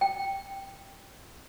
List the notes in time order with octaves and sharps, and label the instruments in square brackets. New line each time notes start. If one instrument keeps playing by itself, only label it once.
[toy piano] G5